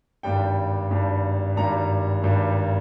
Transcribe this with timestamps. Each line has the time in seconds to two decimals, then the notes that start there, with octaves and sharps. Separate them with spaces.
0.23 G#1 G2 G3 G5
0.90 G#1 G2 G3
1.56 G#1 G2 G3 A#5
2.23 G#1 G2 G3